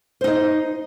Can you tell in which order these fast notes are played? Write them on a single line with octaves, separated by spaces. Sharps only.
C5 D#4 D#5